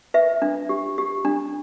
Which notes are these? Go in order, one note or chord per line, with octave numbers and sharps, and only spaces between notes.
B4 E5
D4
G4
G4
D4